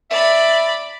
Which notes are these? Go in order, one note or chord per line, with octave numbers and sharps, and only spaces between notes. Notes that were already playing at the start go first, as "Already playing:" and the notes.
D5 E5 B5